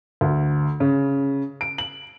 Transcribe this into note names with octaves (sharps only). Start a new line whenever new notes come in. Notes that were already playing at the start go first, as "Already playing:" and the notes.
D2
C#3
D7
F#7